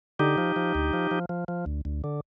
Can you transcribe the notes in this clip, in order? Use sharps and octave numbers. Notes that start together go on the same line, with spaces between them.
D3 D#4 G4
F3
F3
D2
F3
F3
F3
F3
D2
D2
D3